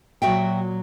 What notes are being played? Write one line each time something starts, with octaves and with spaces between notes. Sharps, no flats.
A#2 F#3 F#4 E5 G5